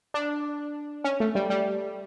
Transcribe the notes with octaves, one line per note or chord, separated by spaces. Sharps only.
D4
C#4
A3
G3
G3